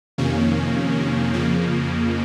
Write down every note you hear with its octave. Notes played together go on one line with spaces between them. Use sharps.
F2 C3 D#3 A#3 C#4
F2 C#3 F3 A#3